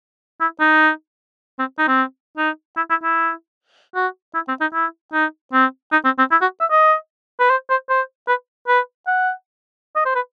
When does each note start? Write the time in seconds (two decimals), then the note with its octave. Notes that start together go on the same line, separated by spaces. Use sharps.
0.41 E4
0.60 D#4
1.59 C4
1.78 D#4
1.88 C4
2.37 D#4
2.77 E4
2.90 E4
3.03 E4
3.95 F#4
4.34 E4
4.48 C4
4.61 D#4
4.73 E4
5.13 D#4
5.53 C4
5.92 D#4
6.05 C4
6.18 C4
6.31 E4
6.41 F#4
6.60 E5
6.70 D#5
7.40 B4
7.50 C5
7.70 C5
7.89 C5
8.28 B4
8.68 B4
9.07 F#5
9.96 D#5
10.05 C5
10.15 B4